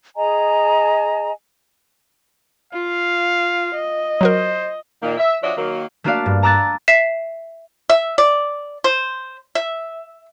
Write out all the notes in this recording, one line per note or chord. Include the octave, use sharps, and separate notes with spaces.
G#4 D#5 G#5 A#5
F4 F5
D#5
F#3 F#4 A#4 C5
A#2 D#3 A#3
E5
F3 D4 F#4 C#5 D#5 E5
D#3 F#3 A#3
A3 A#3 D4 F#4 D5 F5
G2
A5 A#5 D6 E6 F#6 A6
E5 B6 C7 E7
E5
D5
C5
E5